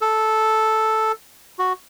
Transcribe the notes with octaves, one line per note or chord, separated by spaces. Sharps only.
A4
F#4